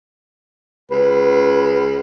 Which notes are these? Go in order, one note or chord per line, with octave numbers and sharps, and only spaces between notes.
C#2 B4